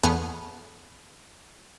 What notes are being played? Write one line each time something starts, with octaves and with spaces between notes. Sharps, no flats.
E2 A3 B3 G#4 F6 C#7